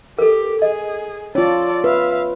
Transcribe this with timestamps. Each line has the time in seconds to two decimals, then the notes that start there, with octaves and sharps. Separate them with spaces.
0.19 G4 A4 A#4
0.62 G#4 D#5
1.35 C#4 F4 A4 C#5 D5
1.84 B4 E5 F5